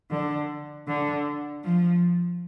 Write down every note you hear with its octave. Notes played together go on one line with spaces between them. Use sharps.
D3
D3
F3